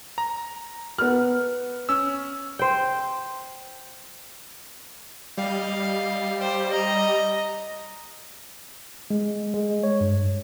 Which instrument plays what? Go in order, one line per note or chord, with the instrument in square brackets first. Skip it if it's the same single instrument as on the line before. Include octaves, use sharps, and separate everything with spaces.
[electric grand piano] A#5
[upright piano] B3 F6
[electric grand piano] C#4 E6
[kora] C5 G5
[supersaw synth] G3 [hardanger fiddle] D#5 F5
[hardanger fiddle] G4 C5
D#5 A#5
[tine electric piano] G#3
G#3
C#5
G2